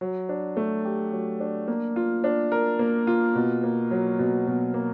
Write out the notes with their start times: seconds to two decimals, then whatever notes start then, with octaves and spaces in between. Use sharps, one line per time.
0.01 F#3
0.29 D4
0.57 A3
0.85 G4
1.12 F#3
1.40 D4
1.68 A#3
1.96 F4
2.24 D4
2.52 A#4
2.79 A#3
3.07 F4
3.35 B2
3.63 A#3
3.91 F#3
4.19 B2
4.47 B2
4.74 A#3